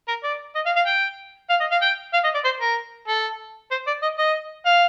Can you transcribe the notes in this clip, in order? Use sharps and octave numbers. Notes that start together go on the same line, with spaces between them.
A#4
D5
D#5
F5
F5
G5
F5
D#5
F5
G5
F5
D#5
D5
C5
A#4
A4
C5
D5
D#5
D#5
F5